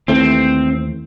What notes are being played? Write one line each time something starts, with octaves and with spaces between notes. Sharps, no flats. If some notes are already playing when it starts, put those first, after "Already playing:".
D#2 E3 A3 C4